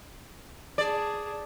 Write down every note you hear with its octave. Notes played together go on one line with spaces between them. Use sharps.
G#4 D5 A5